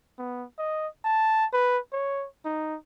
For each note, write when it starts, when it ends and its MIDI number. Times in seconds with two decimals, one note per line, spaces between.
0.18 0.45 59
0.58 0.87 75
1.05 1.45 81
1.53 1.78 71
1.93 2.26 73
2.45 2.76 63